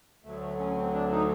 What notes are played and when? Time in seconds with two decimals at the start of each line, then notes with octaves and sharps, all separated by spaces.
0.24 D2 D3 F#3 A3
0.41 A3
0.59 C#4
0.77 C4
0.93 D4
1.11 D#4